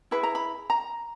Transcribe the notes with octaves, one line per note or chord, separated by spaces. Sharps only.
E4 G#4 B4 B5
A#5
B5
A#5